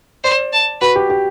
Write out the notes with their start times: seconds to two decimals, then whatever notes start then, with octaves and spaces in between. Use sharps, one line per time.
0.24 C5 D5
0.53 A5
0.81 F#4 B4
0.96 G4
1.10 G4